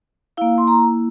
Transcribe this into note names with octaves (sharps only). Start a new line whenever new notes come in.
A#3 E4 F5
C6
A#5